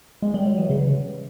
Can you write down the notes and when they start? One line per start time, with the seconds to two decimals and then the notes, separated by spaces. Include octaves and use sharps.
0.22 G#3
0.34 G3
0.46 F#3
0.58 E3
0.69 C#3